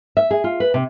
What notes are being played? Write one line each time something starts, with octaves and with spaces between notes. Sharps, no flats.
E5
G#4
F4
B4
C3